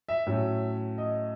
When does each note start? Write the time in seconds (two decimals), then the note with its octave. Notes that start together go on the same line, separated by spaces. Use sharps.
0.09 E5
0.27 A2 F#3 C#4
0.98 D#5